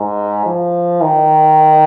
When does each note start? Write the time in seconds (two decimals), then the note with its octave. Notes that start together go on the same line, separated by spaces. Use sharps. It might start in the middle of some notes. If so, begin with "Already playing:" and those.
Already playing: G#2
0.46 F3
1.02 D#3